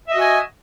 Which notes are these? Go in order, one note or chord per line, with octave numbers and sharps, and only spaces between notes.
F#4 D#5 E5 G#5